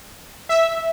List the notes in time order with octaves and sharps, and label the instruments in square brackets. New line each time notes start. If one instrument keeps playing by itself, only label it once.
[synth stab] E5